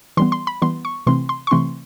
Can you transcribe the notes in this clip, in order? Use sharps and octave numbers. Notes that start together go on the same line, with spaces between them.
E3 G3 B3 C6
C6
B5
E3 G3 B3 C6
C#6
C3 E3 A3 C4 C6
C6
C#6
C3 E3 A3 C4 C6